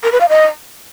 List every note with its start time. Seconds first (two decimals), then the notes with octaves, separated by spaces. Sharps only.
0.03 A#4
0.12 B4
0.20 F5
0.29 D#5